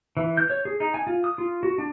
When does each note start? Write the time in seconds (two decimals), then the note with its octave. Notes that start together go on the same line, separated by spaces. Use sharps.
0.17 E3
0.37 G6
0.50 C#5
0.65 G#4
0.80 D#4
0.94 G#5
1.07 F4
1.24 D#6
1.38 F4
1.63 F#4
1.78 D4